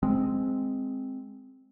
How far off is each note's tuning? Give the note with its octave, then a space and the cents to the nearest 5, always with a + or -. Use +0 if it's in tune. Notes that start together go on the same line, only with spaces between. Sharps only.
G#3 +0 C4 +0